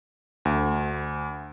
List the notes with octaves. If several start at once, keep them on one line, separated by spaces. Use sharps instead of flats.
D2